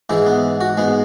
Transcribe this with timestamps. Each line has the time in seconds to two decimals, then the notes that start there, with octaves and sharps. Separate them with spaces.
0.10 G#2 E3 G#3 E4
0.26 B3
0.61 F#4
0.77 G#2 G#3 B3